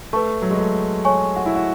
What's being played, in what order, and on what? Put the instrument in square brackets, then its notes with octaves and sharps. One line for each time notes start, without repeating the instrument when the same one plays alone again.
[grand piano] A3 [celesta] B4 E5 A5 C#6
[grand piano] F#3
G#3
A3
[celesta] C#5 G#5 C#6
[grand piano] F#4
E4
F#4